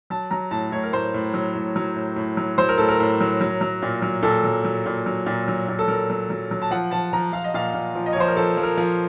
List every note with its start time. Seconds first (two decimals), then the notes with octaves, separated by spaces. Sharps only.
0.10 F#3 A5
0.31 F#3 A#5
0.51 A2 A5
0.72 A2 C#5
0.83 A#4
0.93 A2 C5
1.14 A2
1.34 F#3
1.55 A2
1.76 F#3
1.96 A2
2.16 A2
2.37 F#3
2.58 F#3 C5
2.69 A#4
2.78 A2 A4
2.89 A#4
3.00 A2
3.21 F#3
3.41 F#3
3.61 F#3
3.82 A#2
4.02 F#3
4.23 A#2 A4
4.44 F#3
4.65 F#3
4.86 A#2
5.06 F#3
5.26 A#2
5.48 F#3
5.68 A#2
5.79 A4
5.88 F#3 A#4
6.10 F#3
6.30 F#3
6.51 F#3
6.62 A5
6.71 F3 F#5
6.91 F3 A5
7.13 F3 A#5
7.33 F3 F5
7.44 D#5
7.54 A#2 F5
7.74 A#2
7.95 F3
8.06 D#5
8.13 C#5
8.16 F3 C5
8.28 A#4
8.36 F3 A4
8.57 F3
8.63 A#4
8.77 F3